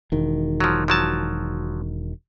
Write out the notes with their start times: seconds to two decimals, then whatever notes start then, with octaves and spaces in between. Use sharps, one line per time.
0.12 E1 D#3
0.60 F3 F#3
0.88 F3 F#3 A5